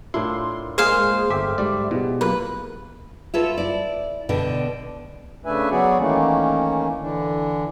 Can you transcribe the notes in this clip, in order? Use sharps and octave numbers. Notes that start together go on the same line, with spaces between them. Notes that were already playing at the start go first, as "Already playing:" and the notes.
A2 D4 E4 F4 A#4 C6
G#3 A#3 G#4 C5 F5
G1 A4 E5 G5 D6
G#2 G3 D5
B2 E4 G4 G#4
F#3 A#3 F4 B4
F4 F#4 A4 B4 C#5 E5
E4 D5
B2 D3 D4 G5
C#3 A3 D4 B4 E5 G#5
F#3 B3 F#4 G#4 C#5 D5
D#3 E3 A3 A#3 C#4
D3 E3 D4